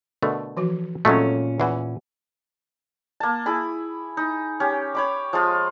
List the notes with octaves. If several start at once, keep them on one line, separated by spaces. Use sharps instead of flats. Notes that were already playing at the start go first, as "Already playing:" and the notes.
B2 D3 A3 A#4
E3 F3 F#4
A#2 F#3 G#3 A3 C4 C#4 A4
E2 E3 E5 F#5 G#5
A#3 A5
E4 G#4 B5
D#4
C#4 G4
C#5 B5 D6
F3 G#3 F4